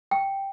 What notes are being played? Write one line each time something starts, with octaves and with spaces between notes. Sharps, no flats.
G5